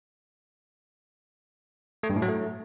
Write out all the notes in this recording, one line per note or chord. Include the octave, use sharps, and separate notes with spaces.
A3
G2
A2
F#3
A3